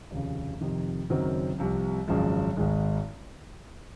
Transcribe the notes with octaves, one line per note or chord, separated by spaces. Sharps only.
F1 D#2 C#3
F1 F2 C3 D#3
F#1 F#2 D#3 F#3 C4
C2 C3 F3
G#1 F#2 C#3 F3 G#3
G#1 G#2 D#3 G#3